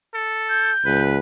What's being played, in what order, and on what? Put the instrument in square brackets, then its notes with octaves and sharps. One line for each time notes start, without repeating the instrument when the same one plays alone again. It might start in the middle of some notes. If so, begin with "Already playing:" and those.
[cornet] A4
[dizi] G6
[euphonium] C#2 [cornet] B4